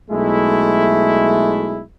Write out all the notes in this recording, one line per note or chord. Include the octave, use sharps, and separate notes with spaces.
B1 G#3 A3 E4